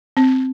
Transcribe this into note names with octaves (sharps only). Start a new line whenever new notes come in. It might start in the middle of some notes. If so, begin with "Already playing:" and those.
C4